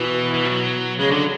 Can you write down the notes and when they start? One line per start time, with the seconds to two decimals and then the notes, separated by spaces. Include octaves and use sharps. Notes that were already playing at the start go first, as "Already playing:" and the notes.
Already playing: B2 E3
0.34 E3
0.45 F#3
0.99 C#3 G#3
1.11 D3 F#3